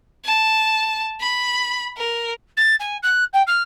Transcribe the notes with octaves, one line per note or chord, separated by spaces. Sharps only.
A5
B5
A#4
A6
G#5
F#6
G5
F6